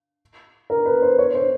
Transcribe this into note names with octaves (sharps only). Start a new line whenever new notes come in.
A#4
B4
C5
C#5
C5